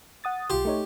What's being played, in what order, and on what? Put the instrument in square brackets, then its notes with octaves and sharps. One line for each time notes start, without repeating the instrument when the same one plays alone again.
[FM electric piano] F#5 D#6 A6
[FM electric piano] B1 F4 C6 [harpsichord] G4
[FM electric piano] A3 D#4 C#5